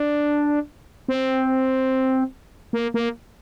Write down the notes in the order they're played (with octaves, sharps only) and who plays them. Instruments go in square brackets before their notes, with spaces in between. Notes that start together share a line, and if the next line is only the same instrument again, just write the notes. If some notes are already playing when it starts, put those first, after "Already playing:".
Already playing: [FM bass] D4
C4
A#3
A#3